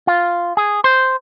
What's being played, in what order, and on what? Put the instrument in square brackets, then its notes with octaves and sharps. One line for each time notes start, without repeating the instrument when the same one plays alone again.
[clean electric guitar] F4
G#4
C5